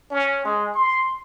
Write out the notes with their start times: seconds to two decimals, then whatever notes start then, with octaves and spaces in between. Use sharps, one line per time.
0.11 C#4
0.45 G#3
0.75 C6